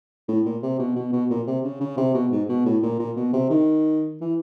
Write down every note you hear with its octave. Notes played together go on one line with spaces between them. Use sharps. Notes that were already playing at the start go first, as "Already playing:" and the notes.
A2
A#2
C3
B2
B2
B2
A#2
C3
C#3
C#3
C3
B2
G#2
B2
A2
A#2
A#2
B2
C3
D#3
E3